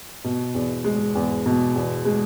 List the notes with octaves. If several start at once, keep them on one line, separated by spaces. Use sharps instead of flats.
B2
E2
G#3
E2
B2
E2
G#3